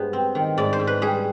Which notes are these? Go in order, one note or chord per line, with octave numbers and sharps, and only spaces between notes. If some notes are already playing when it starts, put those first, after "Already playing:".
Already playing: G2 G#3 B3 C5
C4
D#3
G#2 D5
C5
G#2
B4
G3 G#4